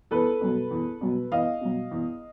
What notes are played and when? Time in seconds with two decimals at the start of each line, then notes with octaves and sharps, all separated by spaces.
0.11 E2 A4 B4
0.41 B2 F#3
0.71 E2
1.01 B2 F#3
1.32 E2 D#5 F5
1.61 B2 F#3
1.91 E2